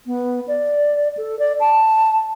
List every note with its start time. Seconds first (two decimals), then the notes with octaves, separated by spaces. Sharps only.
0.06 B3
0.48 D5
1.17 A4
1.39 D5
1.60 A5